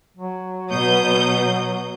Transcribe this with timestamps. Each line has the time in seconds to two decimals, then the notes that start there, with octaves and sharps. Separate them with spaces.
0.17 F#3
0.70 B2 D#6 G6